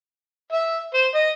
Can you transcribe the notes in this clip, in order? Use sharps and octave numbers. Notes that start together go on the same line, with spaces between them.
E5
C5
D#5